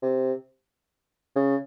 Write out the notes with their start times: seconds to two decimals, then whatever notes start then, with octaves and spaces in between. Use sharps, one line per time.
0.02 C3
1.36 C#3